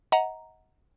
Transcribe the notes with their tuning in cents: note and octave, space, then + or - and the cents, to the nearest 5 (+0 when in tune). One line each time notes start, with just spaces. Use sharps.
D#5 +30 F#5 +0 A#5 +0